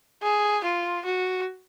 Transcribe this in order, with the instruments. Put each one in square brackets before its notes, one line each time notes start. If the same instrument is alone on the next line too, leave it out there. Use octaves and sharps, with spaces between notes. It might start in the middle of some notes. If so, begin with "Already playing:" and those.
[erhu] G#4
F4
F#4